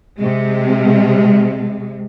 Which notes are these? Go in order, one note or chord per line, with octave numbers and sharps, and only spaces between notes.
C3 G#3